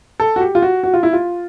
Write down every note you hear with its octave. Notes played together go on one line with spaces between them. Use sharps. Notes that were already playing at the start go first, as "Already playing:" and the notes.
A4
F#4
G4
F4
F#4
F#4
F4
E4
F4